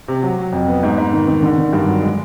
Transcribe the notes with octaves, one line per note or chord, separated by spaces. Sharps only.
C3
F#3
F#3
F2
B3
G#2
G#2
D#3
D#3
D3
D3
G2
F#3
G#3